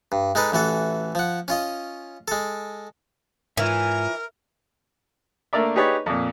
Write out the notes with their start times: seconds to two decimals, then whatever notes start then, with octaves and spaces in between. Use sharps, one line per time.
0.12 G2
0.35 G#3 D#4 A4 B4
0.52 A1 E3 F#4 A4
1.15 F3 F#5
1.48 C#4 F4 D#5
2.28 G#3 A4
3.57 G#2 E3 F4 A#4 C#5 E5
5.53 A3 A#3 D4 A#4 D5 E5
5.75 D#4 G4 G#4 B4 C#5 D5
6.06 F2 A#2